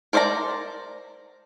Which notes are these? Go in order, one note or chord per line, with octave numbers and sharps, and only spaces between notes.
A#4 C5 D5 E5 A#5